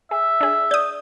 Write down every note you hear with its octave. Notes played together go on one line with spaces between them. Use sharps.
G#4 E5
D4 G#4
D5 D#6 G6